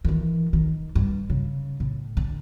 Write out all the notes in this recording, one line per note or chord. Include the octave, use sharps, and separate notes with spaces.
D#3 E3
D#3
G2
C#3
A2
D3